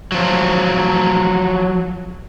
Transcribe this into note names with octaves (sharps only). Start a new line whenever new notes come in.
F3 F#3